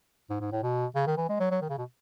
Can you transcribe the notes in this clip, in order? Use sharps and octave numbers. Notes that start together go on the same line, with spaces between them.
G#2
G#2
A2
B2
C#3
D#3
E3
G#3
F#3
F#3
D#3
C#3
B2